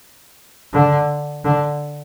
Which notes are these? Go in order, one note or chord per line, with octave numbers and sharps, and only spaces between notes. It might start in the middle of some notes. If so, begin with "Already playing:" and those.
D3
D3